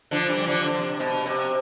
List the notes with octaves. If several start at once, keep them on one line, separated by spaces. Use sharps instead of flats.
D3 F3
E3 G3
D3 F3
D3
C3
B2
C3